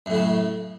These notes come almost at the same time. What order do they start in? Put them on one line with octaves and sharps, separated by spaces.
F#2 A2 C#3